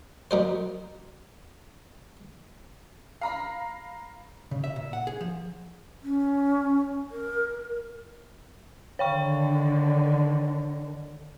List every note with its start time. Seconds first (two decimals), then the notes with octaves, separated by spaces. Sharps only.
0.31 F#2 D#4 C5
3.21 F5 A#5 B5
4.51 C#3
4.64 E5
4.76 A#2
4.93 F#5
5.07 G#4
5.21 F3
6.02 C#4
7.11 A#4
8.99 D3 D#3 C#5 G5 C#6